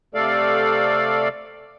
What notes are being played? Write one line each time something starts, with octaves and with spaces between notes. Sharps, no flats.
C3 A3 A4 D5 F5